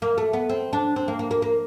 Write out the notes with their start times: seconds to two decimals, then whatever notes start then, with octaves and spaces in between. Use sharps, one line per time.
0.02 A#3
0.18 A3
0.33 B3
0.49 C4
0.73 D4
0.96 C4
1.08 A#3
1.19 A#3
1.31 A#3
1.42 A#3